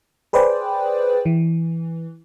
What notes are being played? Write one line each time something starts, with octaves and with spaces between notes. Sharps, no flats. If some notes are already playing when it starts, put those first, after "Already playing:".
G#4 B4 C5 D5 G5
E3